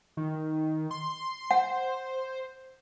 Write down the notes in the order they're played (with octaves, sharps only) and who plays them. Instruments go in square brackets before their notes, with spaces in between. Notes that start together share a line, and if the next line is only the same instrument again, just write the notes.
[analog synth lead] D#3
C6
[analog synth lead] C5 [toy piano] F#5